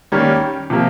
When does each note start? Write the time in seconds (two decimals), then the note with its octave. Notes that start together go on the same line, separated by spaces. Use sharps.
0.12 D#3 G3 A#3 C#4
0.70 C3 F3 A#3